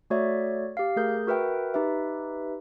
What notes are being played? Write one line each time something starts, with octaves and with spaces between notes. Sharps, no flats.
A3 F#4 C#5 D5 E5
G4 F5
A3 G#4 A#4 G6
F#4 A#4 B4 E5 G5
D#4 G4 B4 E5